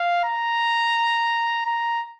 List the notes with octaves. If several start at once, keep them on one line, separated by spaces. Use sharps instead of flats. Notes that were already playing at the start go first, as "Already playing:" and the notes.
Already playing: F5
A#5
A#5